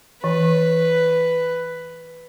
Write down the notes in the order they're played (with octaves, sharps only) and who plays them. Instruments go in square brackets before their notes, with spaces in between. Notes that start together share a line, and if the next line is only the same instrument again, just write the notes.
[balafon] E3 [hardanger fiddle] B4